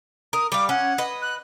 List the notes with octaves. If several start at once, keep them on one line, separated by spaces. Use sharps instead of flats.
A#4 D#6
G3 F5 D6
C#4 F#5
B4 D#5
F#6